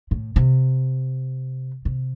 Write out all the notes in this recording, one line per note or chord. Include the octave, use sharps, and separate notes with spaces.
A2
C3
C3